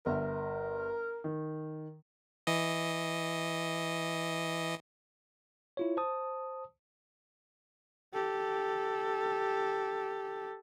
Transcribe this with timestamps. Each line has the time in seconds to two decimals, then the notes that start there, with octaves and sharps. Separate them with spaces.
0.06 G1 A#4 E5
1.24 D#3
2.47 E3 D#5
5.77 E4 F4 C#5
5.97 C5 A5 D#6
8.14 G4 A4